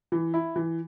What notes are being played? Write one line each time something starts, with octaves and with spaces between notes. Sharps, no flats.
E3
E4
E3